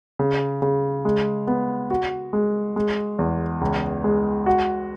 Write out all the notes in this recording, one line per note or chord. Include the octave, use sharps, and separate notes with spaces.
C#3
C#3
G#3
B3
F#4
G#3
G#3
E2
C#2
G#3
F#4